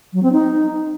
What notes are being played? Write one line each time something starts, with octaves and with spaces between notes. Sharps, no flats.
F#3
C4
D#4